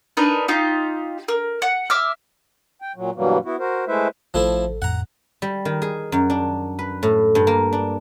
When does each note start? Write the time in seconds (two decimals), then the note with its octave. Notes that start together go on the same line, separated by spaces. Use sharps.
0.17 D4 D#4 A#4 B4
0.48 D#4 F4 G4
1.28 A#4
1.62 F#5
1.90 E5 D6 E6 F6
2.82 G5
2.96 A#2 F#3
3.16 G2 B2 E3 F#3 G3 A#3
3.45 B3 E4 F#4
3.59 F#4 A#4 C5
3.88 G#3 A3 E4 B4 C5 E5
4.34 A1 F3 A3 E4 A4
4.82 F2 A2 F#5 A#5
5.42 G3
5.65 D#3
5.82 G#4
6.12 F#2
6.30 D4
6.79 B4
7.03 A2
7.35 G2
7.47 A#3
7.73 D4